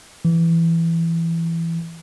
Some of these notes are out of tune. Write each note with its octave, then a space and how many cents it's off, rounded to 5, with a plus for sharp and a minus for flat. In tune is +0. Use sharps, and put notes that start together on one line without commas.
E3 +10